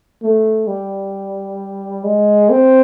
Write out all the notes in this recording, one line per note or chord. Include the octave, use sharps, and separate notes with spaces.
A3
G3
G#3
C4